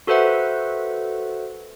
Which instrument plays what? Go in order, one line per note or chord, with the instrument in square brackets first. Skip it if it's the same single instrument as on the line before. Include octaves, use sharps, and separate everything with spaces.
[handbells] F#4 A4 B4 C5 E5 F#5